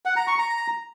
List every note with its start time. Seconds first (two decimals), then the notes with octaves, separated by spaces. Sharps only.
0.05 F#5
0.16 A#5
0.27 C#6
0.38 A#5